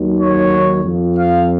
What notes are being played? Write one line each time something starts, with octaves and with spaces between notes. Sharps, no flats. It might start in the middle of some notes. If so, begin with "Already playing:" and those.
Already playing: D#2 D#3 F#3
C#5
F2 F3
F5